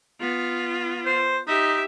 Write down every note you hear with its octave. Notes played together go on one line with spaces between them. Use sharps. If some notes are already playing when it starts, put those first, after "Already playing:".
B3 F4
C5
D#4 G4 E5